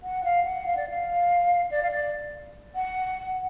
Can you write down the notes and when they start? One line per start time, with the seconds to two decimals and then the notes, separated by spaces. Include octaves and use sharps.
0.03 F#5
0.24 F5
0.45 F#5
0.66 F5
0.77 D5
0.89 F5
1.71 D5
1.83 F5
1.91 D5
2.75 F#5